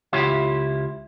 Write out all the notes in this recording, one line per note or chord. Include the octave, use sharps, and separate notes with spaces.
C#2 E4 F4 G4 C#5 E5